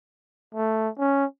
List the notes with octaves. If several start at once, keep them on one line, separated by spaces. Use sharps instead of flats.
A3
C#4